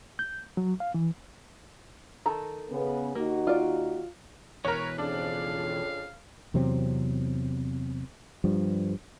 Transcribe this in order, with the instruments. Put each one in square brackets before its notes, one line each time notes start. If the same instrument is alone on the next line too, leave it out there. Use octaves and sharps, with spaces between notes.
[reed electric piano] G6
F#3
F5
E3
[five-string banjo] D#3 A4 A#5
[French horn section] C#3 B3
[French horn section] D#2 D#4 F#4 [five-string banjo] A#3
[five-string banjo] F4 D5
[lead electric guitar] B2 E3 [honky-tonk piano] A#4 C#5 [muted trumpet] B4
[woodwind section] F2 C#3 [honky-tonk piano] D4 [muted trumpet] F5
[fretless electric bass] E2 C3 F#3 C4
G2 F3 G3